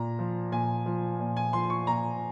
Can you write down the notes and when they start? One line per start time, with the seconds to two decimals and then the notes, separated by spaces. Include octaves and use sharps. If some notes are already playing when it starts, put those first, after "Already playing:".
Already playing: A#2 A#5
0.19 F3
0.52 A#2 G#5
0.86 F3
1.20 A#2
1.37 G#5
1.53 F3 C6
1.70 C#6
1.87 A#2 A#5